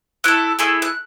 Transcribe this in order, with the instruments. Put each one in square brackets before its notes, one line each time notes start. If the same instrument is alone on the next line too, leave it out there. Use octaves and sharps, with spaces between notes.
[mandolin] A3 E4 A4 F#6
A3 E4 G#4
F#6